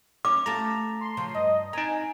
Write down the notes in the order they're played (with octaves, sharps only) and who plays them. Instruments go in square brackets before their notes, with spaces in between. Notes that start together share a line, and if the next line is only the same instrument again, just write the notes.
[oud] C#4 [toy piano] D6
[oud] A3 F4 G4 [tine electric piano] A5 A#5
[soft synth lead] C6
[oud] C#3 F3
[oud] G2 [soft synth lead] D#5
[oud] C4 [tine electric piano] D#4 A#5 [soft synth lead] G#5